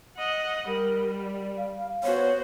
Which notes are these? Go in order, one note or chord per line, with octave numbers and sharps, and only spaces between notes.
D#5 F#5
G3 A#4
D5
F5
B3 F#4 C5 C#5